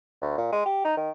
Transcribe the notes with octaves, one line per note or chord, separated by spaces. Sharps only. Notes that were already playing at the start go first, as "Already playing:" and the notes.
D2
A#2
G#3
G4
D#4
D#3